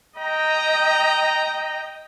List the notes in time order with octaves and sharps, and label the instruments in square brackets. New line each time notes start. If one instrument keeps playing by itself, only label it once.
[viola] D#5 G5 [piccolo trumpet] A#5